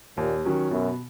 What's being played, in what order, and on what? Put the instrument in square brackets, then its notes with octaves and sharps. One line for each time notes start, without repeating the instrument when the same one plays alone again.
[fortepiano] D#2 [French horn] A#2
[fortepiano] D#3 F#3 C#4
[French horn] F#2 [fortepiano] B2